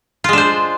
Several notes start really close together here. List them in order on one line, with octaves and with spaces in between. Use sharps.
F4 G#3 D4 C5